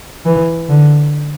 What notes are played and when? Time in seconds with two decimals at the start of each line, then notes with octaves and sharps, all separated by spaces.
0.26 E3
0.69 D3